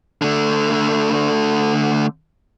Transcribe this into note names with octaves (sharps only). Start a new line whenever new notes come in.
D3 A3